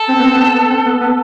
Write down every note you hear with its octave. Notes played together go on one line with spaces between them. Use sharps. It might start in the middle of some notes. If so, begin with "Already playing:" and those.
Already playing: A4
C4
B3
C4
B3
C4
B3
C4
B3
B3